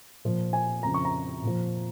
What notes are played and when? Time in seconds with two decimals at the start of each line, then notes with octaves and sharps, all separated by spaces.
0.25 A#2 F3
0.53 G#5
0.83 F2 C#3 F3 A#5
0.94 C#6
1.05 A#5
1.43 A#2 F3